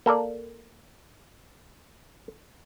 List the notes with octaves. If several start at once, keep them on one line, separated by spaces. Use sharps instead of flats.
A#3 A4 A#4 D5